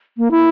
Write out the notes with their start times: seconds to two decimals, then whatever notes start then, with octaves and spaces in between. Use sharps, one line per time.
0.18 A#3
0.31 E4